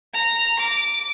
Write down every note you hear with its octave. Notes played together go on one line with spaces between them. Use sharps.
A#5
D6